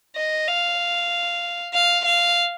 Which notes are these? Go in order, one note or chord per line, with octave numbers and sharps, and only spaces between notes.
D#5
F5
F5
F5